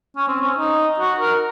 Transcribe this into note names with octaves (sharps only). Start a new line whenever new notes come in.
C#4
C4
C#4
D#4
F#4
A#4